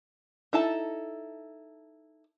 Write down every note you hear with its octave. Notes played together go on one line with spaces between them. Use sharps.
D#4 E4 A4 A5